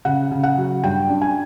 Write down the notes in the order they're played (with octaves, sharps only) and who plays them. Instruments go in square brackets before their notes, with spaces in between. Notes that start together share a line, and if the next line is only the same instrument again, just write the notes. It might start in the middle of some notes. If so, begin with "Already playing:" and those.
[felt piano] C#3 F#5
C#3
F#5
F#3
G2 G5
D4
G#5